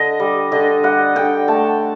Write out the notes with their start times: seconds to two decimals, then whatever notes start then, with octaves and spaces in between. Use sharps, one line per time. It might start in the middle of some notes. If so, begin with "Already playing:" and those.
Already playing: D3 D#5
0.20 G3
0.52 D3 D#5
0.83 G3 F#5
1.16 D3 G5
1.48 A3 A5